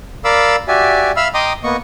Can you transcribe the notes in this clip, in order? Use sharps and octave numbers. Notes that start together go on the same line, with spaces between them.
A#4 D5 F5 B5 D6 E6
F#4 G4 D5 E5 G#5
E5 F5 B5 E6 F6
D#5 G5 A#5 C6 D6 D#6
A#3 B3 D#5 C#6